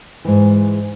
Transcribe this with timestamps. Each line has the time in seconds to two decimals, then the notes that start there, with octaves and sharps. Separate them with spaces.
0.25 G#2 E3